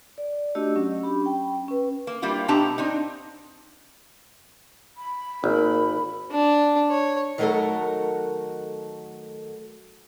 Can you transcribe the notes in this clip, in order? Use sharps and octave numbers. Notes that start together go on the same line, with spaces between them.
D5
A3 D4 F#4 G4 D#5 E6
F#3 C#4
D4 G4 B5
C#4 G5
C#4 B4
A#3
G3 A#3 C4 E4 F4
B2 C4 D4 G4 A5 A#5
C4 D4 D#4
B5
G#1 A#3
D4
C#5
D#3 F#3 A3 F#4 A4 A#4